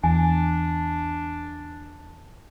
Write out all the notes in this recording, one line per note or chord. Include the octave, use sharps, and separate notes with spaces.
E2 D4 G#5